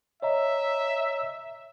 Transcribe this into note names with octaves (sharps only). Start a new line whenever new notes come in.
C#5 D#5 E5 A#5